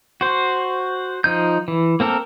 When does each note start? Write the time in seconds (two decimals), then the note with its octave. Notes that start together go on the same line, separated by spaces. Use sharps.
0.21 F#4 C5
1.24 F3 D#4 G6
1.68 E3
2.00 A#3 C4 A4 A#4